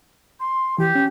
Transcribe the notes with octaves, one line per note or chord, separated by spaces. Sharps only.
C6
E3 G4
C#4